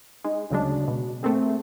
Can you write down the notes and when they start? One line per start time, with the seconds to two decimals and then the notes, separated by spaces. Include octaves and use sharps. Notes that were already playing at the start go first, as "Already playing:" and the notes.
0.24 G#3 D#4
0.50 D2 C#3 F#3 G#3 D4
0.88 B2
1.23 A3 A#3 C4 G#4